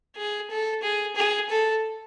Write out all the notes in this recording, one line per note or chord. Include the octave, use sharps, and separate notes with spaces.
G#4
A4
G#4
G#4
A4